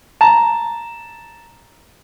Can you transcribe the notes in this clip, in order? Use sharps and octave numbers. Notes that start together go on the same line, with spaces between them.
A5 A#5